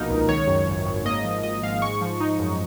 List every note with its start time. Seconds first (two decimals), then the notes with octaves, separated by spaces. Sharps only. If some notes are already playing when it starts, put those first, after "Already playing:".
Already playing: A#1 B2 A#3 D#4 A#4
0.10 C#2
0.28 D#3 C#5
0.48 F#2
0.67 G#1
0.86 G#1
1.05 A#3 D#5
1.24 F3
1.43 G#2 D#5
1.63 G#2 F5
1.82 G#3 C#6
2.01 F3
2.20 D#4
2.39 F#2